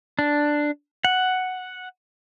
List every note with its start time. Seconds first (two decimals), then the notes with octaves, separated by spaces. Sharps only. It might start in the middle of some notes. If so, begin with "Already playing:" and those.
0.19 D4
1.05 F#5